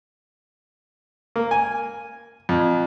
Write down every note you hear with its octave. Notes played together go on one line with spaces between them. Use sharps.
A#3
G#5
F2